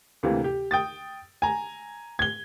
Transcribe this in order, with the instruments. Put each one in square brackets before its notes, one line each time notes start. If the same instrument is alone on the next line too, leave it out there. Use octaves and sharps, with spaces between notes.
[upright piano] D2 C3 E3 A#3
G4
G5 D#6 A6
G#5 A#5
G#6 G7